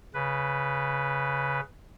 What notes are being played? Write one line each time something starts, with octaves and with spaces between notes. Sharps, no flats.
C#3 B4